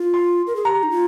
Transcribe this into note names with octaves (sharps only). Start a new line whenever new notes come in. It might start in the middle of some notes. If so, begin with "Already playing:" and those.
Already playing: F4
C6
A#4
G#4
G4 A#5
D#4
F4